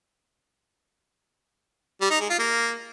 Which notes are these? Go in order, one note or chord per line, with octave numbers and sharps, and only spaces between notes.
G3
D#4
G#3
F4
A#3